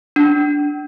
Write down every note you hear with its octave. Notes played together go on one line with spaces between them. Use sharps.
D4